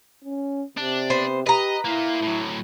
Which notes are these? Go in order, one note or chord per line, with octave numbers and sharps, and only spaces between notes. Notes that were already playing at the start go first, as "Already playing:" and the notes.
C#4
C3 D4
B3 C5
G4 B4 D#5 A#5
A#3 E4 F4
A2 F#3